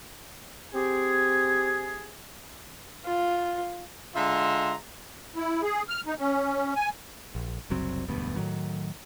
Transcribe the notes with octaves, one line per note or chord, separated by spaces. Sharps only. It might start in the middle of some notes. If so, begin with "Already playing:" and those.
C4 G4 G#4
F4
D3 G#3 F4 E5 A#5 C6
E4
G#4
F6
D#4
C#4
G#5
A#1
F#1 C2 F#3 C4
E1 D2 G2 B3
A2 D#3 F#3